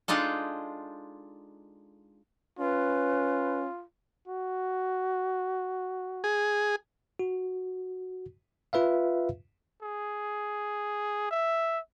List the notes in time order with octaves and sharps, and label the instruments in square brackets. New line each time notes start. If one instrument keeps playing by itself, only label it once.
[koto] G#3 D4 D#4 F4 A4
[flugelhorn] C#4 [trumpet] F4 [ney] B4
[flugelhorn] F#4
[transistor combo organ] G#4
[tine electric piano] F#4
F4 B4 E5 F5
[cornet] G#4
E5